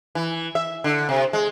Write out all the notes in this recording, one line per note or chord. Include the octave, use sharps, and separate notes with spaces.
E3
E5
D3
C3
G#3